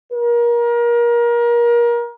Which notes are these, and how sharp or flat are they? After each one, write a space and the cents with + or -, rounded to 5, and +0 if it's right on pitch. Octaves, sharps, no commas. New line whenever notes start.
A#4 +30